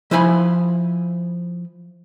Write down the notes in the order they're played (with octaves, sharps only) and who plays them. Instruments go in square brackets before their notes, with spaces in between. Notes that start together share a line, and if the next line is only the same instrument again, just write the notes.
[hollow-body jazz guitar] F3 E4 C5 G#5 B5